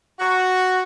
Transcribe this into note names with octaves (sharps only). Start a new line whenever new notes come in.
F#4